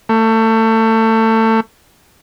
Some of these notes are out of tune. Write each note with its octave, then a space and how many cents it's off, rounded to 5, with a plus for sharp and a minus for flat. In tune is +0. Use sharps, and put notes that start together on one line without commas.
A3 +25